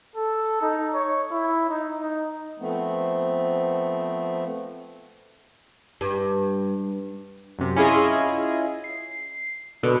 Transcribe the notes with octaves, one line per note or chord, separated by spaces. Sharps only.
A4
D#4
C#5
E4
D#4
D#4
F3 A3 B3 C4
G2
F#2 C3
C#4 E4 F4 G#4 D#5
C7
B2 D3